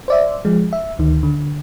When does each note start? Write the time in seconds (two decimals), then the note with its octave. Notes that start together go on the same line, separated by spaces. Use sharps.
0.08 C5 D5 E5
0.45 F3 G#3
0.73 E5
0.99 D2 D#3
1.23 D3